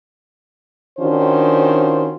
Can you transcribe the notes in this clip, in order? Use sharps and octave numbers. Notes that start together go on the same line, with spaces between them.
D#3 C#4 D4 F4 F#4 C5